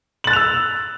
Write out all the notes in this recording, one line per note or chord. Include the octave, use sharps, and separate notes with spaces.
E6 F#6 A6 F7 F#7